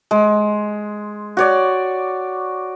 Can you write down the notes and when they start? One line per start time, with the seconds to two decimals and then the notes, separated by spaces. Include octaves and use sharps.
0.11 G#3
1.37 F#4 C#5 D5